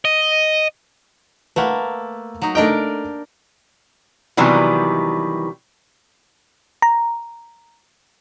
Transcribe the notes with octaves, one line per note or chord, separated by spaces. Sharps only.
D#5
A3 A#3 B4 F#5
F#3 D#4
A3 D4 D#4 A#4 D#5 G5
C3 D#3 E3 F#3 G3 B3
A#5